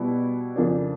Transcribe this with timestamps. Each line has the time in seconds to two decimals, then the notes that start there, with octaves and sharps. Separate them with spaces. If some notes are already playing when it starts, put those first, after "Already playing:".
Already playing: B2 G3 B3 E4
0.56 F2 C#3 F3 A#3 D4